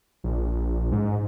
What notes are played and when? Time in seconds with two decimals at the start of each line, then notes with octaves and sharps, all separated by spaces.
0.24 A#1
0.92 G#2